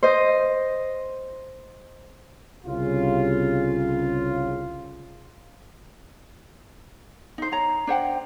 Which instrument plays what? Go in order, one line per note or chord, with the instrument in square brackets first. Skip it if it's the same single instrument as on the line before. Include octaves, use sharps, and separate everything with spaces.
[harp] C5 D#5
[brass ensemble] C2 C#3 F4
[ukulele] D#4 C5
D#4 C#5 A#5
D4 C5 F#5 G5